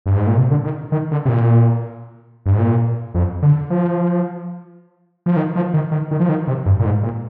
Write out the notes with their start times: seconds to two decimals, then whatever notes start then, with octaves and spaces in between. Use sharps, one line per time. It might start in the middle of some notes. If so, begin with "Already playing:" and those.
0.06 G2
0.17 G#2
0.27 A#2
0.37 C3
0.51 D3
0.65 D#3
0.92 D#3
1.11 D3
1.25 C3
1.29 A#2
2.46 G2
2.53 G#2
2.59 A#2
3.14 F2
3.42 D3
3.70 F3
5.26 F3
5.36 D#3
5.56 F3
5.74 D#3
5.91 D#3
6.11 D#3
6.20 F3
6.29 D#3
6.47 C3
6.66 G2
6.79 A#2
6.85 G#2
7.03 A#2